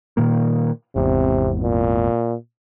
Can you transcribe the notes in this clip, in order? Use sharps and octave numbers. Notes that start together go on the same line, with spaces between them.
A#2 D#3 A#3
G#1 E2 C3
A#2